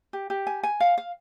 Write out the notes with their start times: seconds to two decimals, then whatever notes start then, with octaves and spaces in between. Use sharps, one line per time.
0.13 G4
0.30 G4
0.47 G#5
0.63 G#5
0.80 F5
0.98 F5